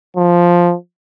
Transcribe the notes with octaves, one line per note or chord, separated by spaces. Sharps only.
F3